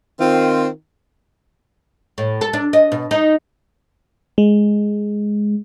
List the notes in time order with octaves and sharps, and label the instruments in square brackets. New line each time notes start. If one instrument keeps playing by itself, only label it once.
[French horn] D#3 [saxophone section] C4 F4
[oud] A2
A4
D4
D#5
B2
D#4
[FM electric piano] G#3